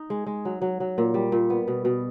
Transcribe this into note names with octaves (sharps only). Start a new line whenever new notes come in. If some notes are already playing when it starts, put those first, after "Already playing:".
Already playing: D#4
G#3
G#3
F#3
F#3
F#3
A#2
G3
A#2
B3
B2
B2